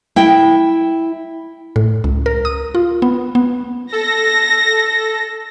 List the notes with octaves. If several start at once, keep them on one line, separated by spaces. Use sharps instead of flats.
E4 G5
A2
C#2
A#4
D#6
F4
B3
B3
A4 A#6